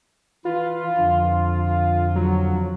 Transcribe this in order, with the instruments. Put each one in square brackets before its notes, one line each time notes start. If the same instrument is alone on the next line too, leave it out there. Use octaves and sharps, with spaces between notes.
[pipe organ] E3 B4 [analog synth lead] F4
[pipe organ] F2 D3 F3
[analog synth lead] F#3